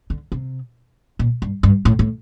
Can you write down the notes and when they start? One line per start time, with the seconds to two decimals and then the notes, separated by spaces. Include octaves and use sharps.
0.10 D3
0.32 C3
1.19 A#2
1.42 G2
1.63 G2
1.85 A2
1.99 A2